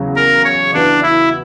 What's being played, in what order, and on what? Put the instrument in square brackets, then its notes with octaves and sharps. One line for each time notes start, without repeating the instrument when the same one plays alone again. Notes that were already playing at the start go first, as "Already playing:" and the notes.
Already playing: [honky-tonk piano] E2 C#3 F#3
[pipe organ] A#4
C#5
[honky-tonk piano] E3 B3 F#4 B4 [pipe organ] D4
[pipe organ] E4